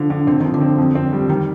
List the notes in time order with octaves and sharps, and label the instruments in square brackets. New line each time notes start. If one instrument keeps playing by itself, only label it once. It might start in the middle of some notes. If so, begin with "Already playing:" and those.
Already playing: [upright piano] D3 F3
D3
[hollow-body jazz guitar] D3 [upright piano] C4
[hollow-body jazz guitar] D#3 [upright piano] F3
[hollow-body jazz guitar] D3
[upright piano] C4
F2
C4
G3
[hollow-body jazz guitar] D#3 [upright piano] G3